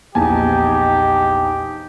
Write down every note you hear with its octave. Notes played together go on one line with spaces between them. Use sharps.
A#1 E2 D#4 G4 G#5 A5